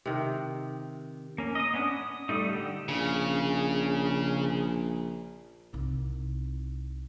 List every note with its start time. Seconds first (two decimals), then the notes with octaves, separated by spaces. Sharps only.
0.06 C3 D#3
1.38 A#3 C#4
1.55 D#5 D#6
1.74 B3 C#4 D4
1.90 D#6
2.29 G3 A3 D#4
2.49 D3 G4
2.89 A#1 C#3
5.73 C2 D#4